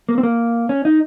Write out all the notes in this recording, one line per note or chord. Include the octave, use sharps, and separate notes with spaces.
A#3
C4
A#3
C#4
D#4